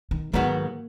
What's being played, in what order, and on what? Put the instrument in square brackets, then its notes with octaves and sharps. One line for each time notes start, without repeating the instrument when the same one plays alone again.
[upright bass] D#3
[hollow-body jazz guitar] G#2 D#3 F#3 B3 F#4 [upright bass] A#3